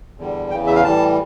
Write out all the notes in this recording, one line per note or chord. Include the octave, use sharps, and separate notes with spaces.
E2 D3 G3
E2 C#3 E3 G5
E5
F5
A2 E3 G3 A5